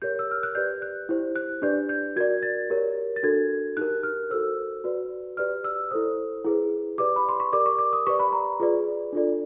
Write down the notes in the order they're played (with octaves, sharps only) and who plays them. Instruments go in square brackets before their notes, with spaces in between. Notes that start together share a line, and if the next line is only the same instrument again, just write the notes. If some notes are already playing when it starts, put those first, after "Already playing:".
[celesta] G4 A#4 C#5 G6
E6
F6
F#6
G4 B4 D5 G6
F#6
E4 G4 C5
F#6
D4 G4 B4 D5 G6
G6
F#4 A#4 D5 G#6
A6
G4 A#4 C#5
A6
D4 F#4 A4 G#6
D#4 G4 A#4 F#6
F6
F#4 A4 C5 E6
F#4 B4 D5
G4 B4 D5 F6
E6
E4 A4 C5 D#6
E4 G#4 B4
G4 B4 D5 D6
B5
C6
C#6
G4 A#4 D5 D6
C#6
D6
D#6
G4 B4 D5 C#6
B5
A#5
F4 G#4 B4 D5
D4 F4 A4 D5